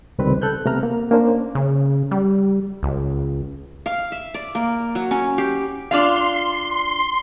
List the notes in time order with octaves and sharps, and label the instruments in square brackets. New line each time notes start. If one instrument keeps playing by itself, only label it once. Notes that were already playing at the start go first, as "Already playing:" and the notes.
[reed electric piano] C#2 C3 D#3 G3 C4 B4
A4 F#6 G6
C3 A3 B3 A#5 F6
A#3
A#3 C#4 D4 C5
[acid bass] C#3
G3
C#2
[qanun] F5
E5
D5
A#3
F#3
C#4
G4
[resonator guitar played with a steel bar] D4 F4 F5 [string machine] C6